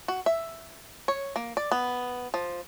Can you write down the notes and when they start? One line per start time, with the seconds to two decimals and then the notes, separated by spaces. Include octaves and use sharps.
0.08 F#4
0.26 E5
1.08 C#5
1.36 A#3
1.57 D5
1.72 B3
2.34 F3